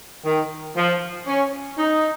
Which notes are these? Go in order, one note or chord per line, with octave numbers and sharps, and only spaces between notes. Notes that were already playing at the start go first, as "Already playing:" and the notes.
D#3
F3
C#4
D#4